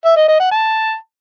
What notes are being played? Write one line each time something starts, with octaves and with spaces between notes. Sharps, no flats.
E5
D#5
D#5
F#5
A5